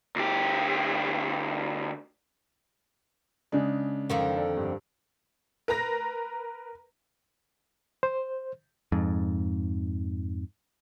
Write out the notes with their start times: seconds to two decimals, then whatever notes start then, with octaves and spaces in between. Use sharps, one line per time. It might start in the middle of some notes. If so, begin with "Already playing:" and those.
0.16 D2 G4
3.52 C#3 G#3 D4
4.10 F2 D3 D#3
4.36 A4 D5
4.57 G2
5.68 A#4 B4 A#5 A#6
8.03 C5
8.92 F2 G#2